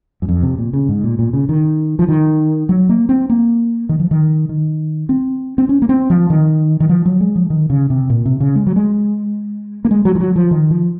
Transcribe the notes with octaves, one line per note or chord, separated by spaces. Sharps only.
F#2
F2
C3
A#2
C#3
G#2
A#2
A#2
C#3
D#3
F3
D#3
F#3
A#3
C4
A#3
D#3
F3
D#3
D#3
C4
C4
C#4
A#3
C4
F3
D#3
D#3
F3
F#3
G#3
F3
D#3
C#3
C3
A#2
C3
C#3
G#3
F#3
G#3
A#3
G#3
F#3
F3
F#3
F3
D#3
F3